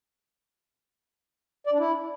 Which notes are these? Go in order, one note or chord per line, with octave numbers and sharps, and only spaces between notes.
D5
D4
E4